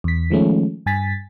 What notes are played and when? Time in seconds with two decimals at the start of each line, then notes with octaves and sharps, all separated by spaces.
0.04 E2 B6
0.30 D#3 F3 G#3 A3 C#4
0.86 G2 G#5 A6 B6